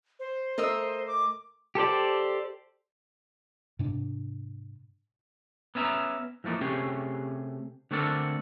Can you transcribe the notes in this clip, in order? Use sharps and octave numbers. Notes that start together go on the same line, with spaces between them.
C5
A3 A#4 D#5 E6
D6
G4 A4 C5 D5
G#2 C3 D4
B3 C#4 E5 A5 A#5
E3 F3 A3 A#3 D#4
C3 A3 C#4 G4 G#4
D3 A3 C4 D4 A4 A#4